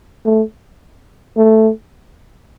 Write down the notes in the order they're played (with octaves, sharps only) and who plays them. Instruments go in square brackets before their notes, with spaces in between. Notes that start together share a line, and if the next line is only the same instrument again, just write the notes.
[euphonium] A3
A3